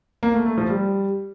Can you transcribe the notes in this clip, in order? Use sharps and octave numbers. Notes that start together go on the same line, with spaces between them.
A#3
A3
A3
F3
G3